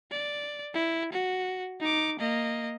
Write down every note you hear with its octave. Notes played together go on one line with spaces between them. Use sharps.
D5
E4
F#4
D#4 D6
A#3 D#5